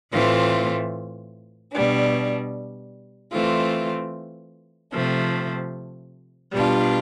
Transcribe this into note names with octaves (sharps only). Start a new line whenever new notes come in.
A2 E3 A3 C4 F4
B2 G3 D4
E3 A3 C4 F4
C3 F3 A3
B2 G3 D4 F4